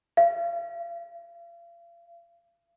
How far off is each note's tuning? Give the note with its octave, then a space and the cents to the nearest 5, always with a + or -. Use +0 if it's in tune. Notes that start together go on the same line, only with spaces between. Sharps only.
F5 -40